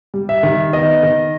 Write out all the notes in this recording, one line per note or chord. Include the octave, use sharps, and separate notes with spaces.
G3
E5
D#3
B3 D#5
D#3